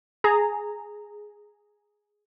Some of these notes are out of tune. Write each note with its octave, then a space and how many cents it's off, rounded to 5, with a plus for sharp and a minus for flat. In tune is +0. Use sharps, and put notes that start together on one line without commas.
G#4 +0 A#5 -15